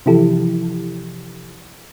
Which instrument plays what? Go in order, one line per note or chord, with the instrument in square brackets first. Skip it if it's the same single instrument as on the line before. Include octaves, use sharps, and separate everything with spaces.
[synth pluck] C3 E3 F3 E4 G4 A4